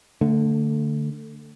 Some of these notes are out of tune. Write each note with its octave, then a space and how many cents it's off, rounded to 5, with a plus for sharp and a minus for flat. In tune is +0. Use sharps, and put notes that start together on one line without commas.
D3 +0 A3 +25